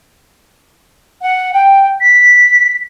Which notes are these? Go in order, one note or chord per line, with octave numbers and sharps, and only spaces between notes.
F#5
G5
B6